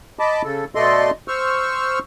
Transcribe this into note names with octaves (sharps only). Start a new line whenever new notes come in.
D#5 A5 B5 D6
C#3 A4
B2 A3 A4 D5 D#5 C6
C5 C#6 E6 F6